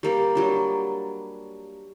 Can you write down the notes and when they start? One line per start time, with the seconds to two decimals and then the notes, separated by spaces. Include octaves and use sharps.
0.03 G3 A#3 G4
0.35 F#3 G3 D4